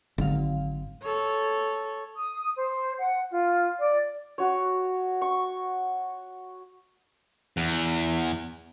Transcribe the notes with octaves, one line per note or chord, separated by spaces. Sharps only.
G#1 D3 F#3 F5
A4 C#5
D#6
C5
F#5
F4
D5
F#4 C#5
C#6
E2